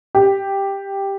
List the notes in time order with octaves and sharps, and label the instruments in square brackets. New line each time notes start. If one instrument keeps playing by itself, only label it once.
[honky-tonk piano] G4